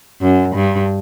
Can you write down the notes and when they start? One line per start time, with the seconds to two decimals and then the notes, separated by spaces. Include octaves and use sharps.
0.21 F#2
0.55 G2